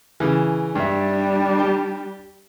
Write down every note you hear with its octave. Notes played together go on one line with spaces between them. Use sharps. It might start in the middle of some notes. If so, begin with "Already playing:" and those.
C#3 E3
G2 G3 D4 E5
G4